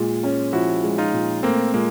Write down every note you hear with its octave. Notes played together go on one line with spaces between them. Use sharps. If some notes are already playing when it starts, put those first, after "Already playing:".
Already playing: A#2 G#3
C#4
F3 E4 F#4
G#3
D#4 F4
A#2
A3 A#3 C4
A#2 G#3 A#3